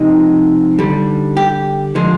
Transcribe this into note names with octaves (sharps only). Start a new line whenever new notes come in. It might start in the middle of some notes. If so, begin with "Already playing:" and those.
Already playing: C3 F3 G#3 D#4
D3 G3
G4
D3 F3 G#3